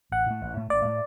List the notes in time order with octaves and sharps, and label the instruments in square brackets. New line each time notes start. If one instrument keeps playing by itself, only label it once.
[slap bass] A1 [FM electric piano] F#5
[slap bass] A2 A3
A1
A2 A3
[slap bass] A1 [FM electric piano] D5
[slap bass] A2 A3